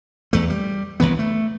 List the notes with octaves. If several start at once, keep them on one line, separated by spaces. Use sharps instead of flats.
E2 A3
G3
C2 F2 E3 B3
A3